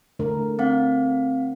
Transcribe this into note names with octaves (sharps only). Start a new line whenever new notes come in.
D3 A3 A#4
C4 F5 F#5